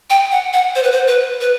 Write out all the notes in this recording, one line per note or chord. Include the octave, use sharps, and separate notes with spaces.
G5
F#5
F#5
C5
B4
C5
B4
B4